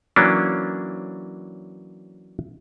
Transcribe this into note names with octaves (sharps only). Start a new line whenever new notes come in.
E3 F#3 A#3 C#4 D4